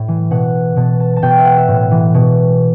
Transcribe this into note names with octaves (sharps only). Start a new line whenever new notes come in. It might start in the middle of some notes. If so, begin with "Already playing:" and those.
Already playing: A2
E3
B2 F#5
B2 A5
A5
A5
B2 G5
E5
F#5
E5
A2
E3
B2